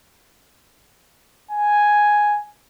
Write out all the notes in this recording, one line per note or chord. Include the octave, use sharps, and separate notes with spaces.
G#5